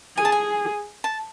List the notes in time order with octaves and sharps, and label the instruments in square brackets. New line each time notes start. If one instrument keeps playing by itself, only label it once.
[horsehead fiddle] G#4 [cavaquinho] G#5
[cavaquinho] A5
G#5
A5